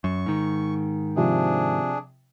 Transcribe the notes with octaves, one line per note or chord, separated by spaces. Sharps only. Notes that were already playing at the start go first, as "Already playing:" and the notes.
F#2 C#6
G#2 D#3
C3 F3 D4 G#4